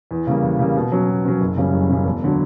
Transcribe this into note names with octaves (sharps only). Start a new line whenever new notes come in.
E2
C#3 G3 A#3
E2
C#3 G3 A#3
B2
F#3 C#4
B2
F#3 C#4
F#1
F#2 C#3 G3 C#4
F#1
F#2 C#3 G3 C#4
E1
D3 F#3